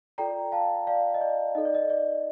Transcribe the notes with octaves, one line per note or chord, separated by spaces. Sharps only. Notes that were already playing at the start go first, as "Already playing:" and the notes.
F4 A4 D5 G5 A#5
F5 A5
D5 F5
D#5
D5
D#4 A4 D5 D#5
D5
D#5
D5